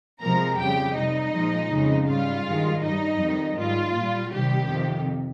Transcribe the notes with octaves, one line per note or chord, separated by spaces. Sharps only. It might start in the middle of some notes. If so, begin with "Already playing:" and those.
C3 F3 G#3 A#4 A#5
F2 C#3 G3 G4 G5
C3 G3 D#4 D#5
A#2 F3 G#3
F2 C#3 G#3
G#2 G3 F4 F5
G2 D#3 G#3
G2 G3 D#4 D#5
F2 D#3 G3
G#2 G3 F4
A#2 G3
C3 D#3 G3 G4
F2 C3 D#3